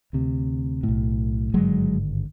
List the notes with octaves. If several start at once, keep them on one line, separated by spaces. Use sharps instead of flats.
D2 C3
A2
B1
G#1 G2 D3 F#3 G#3